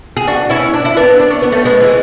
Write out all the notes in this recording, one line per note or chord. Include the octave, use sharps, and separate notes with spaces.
G#4
D4 F#4
C#4 E4
D4
E4
B3 D4
D4
C#4
B3
A3 C#4
G#3 B3
E3 G#3